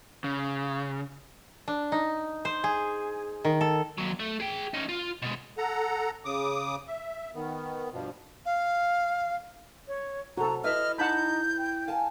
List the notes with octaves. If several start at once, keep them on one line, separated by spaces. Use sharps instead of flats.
C#3
D4
D#4
C5
G#4
D#3
A4
D#2 F#3
A3
G#4 G5
C#4 D#4
F4
B2 G#3
A4 F#5 A#5
C#3 D6 D#6
E5
D#3 B3
G2 B2 F3
F5
C#5
C3 F#4 A4 A#5
E4 B4 D#5 E5 F6
D#4 F#5 A5 B5 G6
G5
F5 G#5 A5